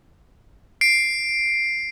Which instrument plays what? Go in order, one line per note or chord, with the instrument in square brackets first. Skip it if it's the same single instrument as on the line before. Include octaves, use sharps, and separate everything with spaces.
[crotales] C7 D7